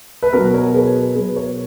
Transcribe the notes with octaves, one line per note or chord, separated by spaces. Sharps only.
B4
B2 F#3 F#4 A#4
A#4 C#5
G#4 B4
B2 F#3 G#4 B4
A#4 C#5